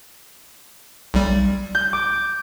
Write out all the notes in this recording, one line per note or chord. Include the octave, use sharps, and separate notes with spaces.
B1 G3
G6
D6